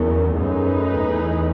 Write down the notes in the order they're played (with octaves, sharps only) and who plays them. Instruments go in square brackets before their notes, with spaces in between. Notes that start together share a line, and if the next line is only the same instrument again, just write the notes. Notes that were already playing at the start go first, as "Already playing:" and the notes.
Already playing: [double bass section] E2 [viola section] D#3 F#3 C#4
[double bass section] F#2 [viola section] A3 D#4 G#4 B4
[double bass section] E2